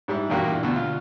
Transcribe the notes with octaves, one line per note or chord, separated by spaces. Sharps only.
G#2 G3 E4
E2 G2 A#2 A#3 F#4 G4
D2 B2
F4